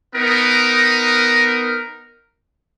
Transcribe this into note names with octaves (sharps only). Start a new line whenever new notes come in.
B3 D#4 A#4